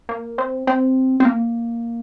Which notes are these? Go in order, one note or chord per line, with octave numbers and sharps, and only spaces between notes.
A#3
C4
C4
C4
A#3